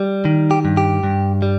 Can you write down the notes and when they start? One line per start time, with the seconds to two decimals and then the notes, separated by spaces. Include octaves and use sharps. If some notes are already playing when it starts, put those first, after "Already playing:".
Already playing: G3
0.25 D#3
0.51 G4
0.65 G2
0.77 G4
1.04 G2
1.42 G3